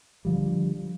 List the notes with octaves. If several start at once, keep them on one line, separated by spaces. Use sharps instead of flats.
D3 F3 G3